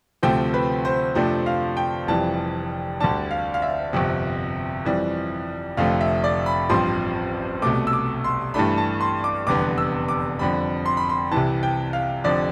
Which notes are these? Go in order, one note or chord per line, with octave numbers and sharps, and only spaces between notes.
D2 C3 F3 A3 C4 G5
B4
C5
F2 C3 F3 A3 D4 C5
F5
G5
F1 F2 E3 G3 A5
D2 D3 G3 D4 A5
F5
F5
E5
G1 F2 C3
F2 E3 G3
F1 F2 D3 A3 F5
E5
D5
B5
A1 G2 F3 C4 C6
C2 B2 A3 D6
E6
D6
C6
G2 E3 A3 D4 B5
A5
C6
D6
F1 E2 D3 G3 B3 D6
E6
D6
F2 D3 G3 B5
C6
B5
C6
C2 C3 E3 A5
G5
F5
F1 F2 D3 D5